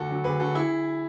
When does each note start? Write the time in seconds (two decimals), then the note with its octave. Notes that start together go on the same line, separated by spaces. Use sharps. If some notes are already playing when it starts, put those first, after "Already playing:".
Already playing: D2 F#4 A4
0.09 D3 F#3
0.24 D2 G#4 B4
0.39 D3 F#3 F#4 A4
0.55 E4 G#4